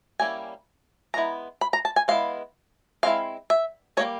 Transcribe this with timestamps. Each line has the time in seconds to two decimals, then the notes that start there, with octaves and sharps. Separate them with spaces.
0.20 G3 A#3 C#4 E4 G#5
1.14 E3 G#3 B3 E4 A#5
1.61 B5
1.73 A#5
1.85 A5
1.96 G#5
2.08 G#3 B3 E4 F5
3.03 G#3 C4 E4 F5
3.50 E5
3.97 G3 A#3 D#4 C#5